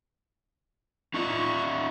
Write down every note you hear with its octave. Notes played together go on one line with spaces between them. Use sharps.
D#4 F4 D#5 C#6